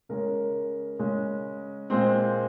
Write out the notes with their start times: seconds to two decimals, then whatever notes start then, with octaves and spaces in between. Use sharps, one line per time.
0.09 C#3 G#3 C#4 A#4
0.99 C#3 G#3 C#4
1.90 A#2 G#3 C4 C5